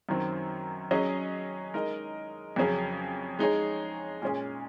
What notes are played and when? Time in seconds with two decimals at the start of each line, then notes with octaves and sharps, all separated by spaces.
0.09 F#2 D#3 F#3 C4
0.91 F#3 C#4 G#4 D#5
1.74 G#3 D#4 A#4 D#5
2.56 F2 C#3 F#3 C#4 G#4
3.39 G#3 D#4 G#4 C#5
4.22 A#2 G#3 C#4 G#4